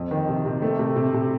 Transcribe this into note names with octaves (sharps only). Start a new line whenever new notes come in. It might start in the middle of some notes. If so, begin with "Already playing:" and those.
Already playing: F2
D#3
C3
C3
A3
C3
C3
C3